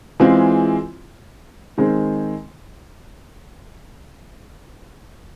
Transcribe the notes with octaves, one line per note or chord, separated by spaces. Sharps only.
E3 G#3 C4 F4 G#4
D#3 G#3 C4